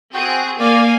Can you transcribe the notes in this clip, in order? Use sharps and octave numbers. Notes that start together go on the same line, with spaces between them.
C4 F#4 G#4 G5
A#3 A#4 D5 F5 G#5